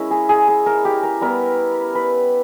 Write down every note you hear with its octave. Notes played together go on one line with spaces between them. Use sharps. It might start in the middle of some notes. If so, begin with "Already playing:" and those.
Already playing: G#3 C#4 E4 A#4
G#4
G#4
G#4
A#4
G4
A#4
G3 B3 E4 A#4
B4